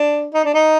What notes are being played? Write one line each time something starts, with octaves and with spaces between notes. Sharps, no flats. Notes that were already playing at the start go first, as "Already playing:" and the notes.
Already playing: D4
D#4
D4
D#4